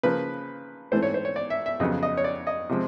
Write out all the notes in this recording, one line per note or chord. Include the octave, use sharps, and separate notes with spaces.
C#3 F3 A#3 B4
G#2 E3 A3 C4 C5
C#5
C5
C#5
D5
E5
E5
F2 C#3 F#3 B3 D#5
D#5
C#5
D5
D#5
C3 F3 G#3 C4